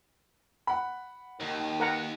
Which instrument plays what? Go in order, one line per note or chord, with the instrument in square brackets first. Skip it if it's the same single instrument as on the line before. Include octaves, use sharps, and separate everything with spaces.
[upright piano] F#5 B5
[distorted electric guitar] D#2 [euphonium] D#3
[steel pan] A#4 F#5 A#5